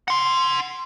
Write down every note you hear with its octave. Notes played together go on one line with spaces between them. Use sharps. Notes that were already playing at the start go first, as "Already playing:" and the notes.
F#5 C6